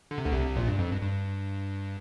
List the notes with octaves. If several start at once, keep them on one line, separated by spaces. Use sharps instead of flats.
D3
C3
D2 D3
C2 C3
A#1 A#2
G2
F2
G2
G2